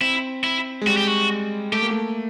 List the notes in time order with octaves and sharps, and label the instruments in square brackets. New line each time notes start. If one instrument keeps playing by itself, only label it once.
[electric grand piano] C4 [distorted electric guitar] E4
[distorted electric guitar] E4
[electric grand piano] G#3
[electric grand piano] G3 [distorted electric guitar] F#4
[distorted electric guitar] G4
F#4
[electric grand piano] A3 [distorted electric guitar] G4
[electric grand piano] A#3
A3